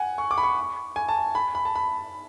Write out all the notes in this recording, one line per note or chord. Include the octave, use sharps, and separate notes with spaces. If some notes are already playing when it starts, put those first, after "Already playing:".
Already playing: F#5 G#5
C#6
D6
B5
C#6
G#5
A5
B5
B5
A5
B5